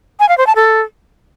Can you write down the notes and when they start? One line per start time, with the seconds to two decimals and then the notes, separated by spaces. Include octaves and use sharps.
0.20 G#5
0.29 F5
0.38 C5
0.47 A5
0.56 A4